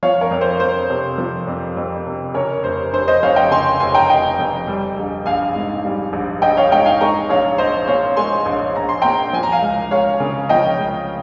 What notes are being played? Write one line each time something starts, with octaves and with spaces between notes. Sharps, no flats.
F3 C#5 F5
A#4 C#5
F2
C5
F2 C5
C3
F3
F2
F2
C3
C#3 A#4 C#5
F1 C5
F1 C5
C5 D#5
F2 C#5 F5
D#5 G5
C#3 G#5 C6
F1 G#5 C6
G5 A#5
F1 D#5 G5
F2
G3
A#1
A#1 F5 G#5
G#2
G3
A#1
A#1 D#5 G5
C#5 F5
G#2 D#5 G5
F5 G#5
G#3 A#5 C#6
A#1 C#5 F5
A#1 C5 D#5
A#2 C#5 F5
G#3 G#5 C6
A#1
A#1 A#5
C6
A#2 G5 A#5
F3 G#5
A#5
F5 G#5
C#2
C#2 C#5 F5
C#3
F3 D#5 G5
C#2